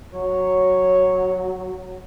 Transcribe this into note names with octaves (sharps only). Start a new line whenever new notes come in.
F#3 C#5